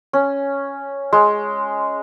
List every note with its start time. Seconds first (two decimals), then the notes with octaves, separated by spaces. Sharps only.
0.13 C#4
1.13 G#3